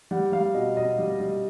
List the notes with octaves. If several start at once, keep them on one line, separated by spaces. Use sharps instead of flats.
G3 F#5
G3 F5
B2 D#5
B2 D#5
G3
G3